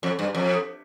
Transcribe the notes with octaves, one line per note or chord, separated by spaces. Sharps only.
F2
G2
F2